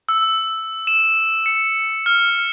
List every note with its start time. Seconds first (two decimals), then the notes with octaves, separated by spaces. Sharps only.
0.09 E6
0.87 E7
1.46 C#7
2.06 F6